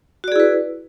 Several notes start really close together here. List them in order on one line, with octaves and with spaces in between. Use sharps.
F#4 D5 G#4 E4 B4